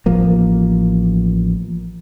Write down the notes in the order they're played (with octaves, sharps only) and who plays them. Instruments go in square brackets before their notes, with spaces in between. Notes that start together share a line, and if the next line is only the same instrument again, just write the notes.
[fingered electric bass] A1 F3 A#3